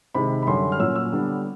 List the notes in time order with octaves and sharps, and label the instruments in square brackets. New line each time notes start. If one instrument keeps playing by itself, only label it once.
[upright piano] C3 D#3 G#3 B5
B5
F#2 D3 G3 C6
F6
A#2 F#3 A#3 C#4 E6
E6
D3 G3 B3 D4